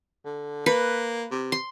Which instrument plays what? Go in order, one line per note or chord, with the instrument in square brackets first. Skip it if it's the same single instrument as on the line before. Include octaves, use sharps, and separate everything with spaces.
[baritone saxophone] D3
[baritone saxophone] A#3 [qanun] B4
[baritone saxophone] C3
[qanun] C6